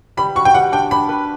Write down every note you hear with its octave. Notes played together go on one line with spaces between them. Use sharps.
G3 B5
F#4 C#6
G5
G3 F#5
D4 G5
D4 B5
B4